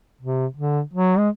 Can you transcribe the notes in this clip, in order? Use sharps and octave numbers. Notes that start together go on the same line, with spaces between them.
C3
D3
F#3
G#3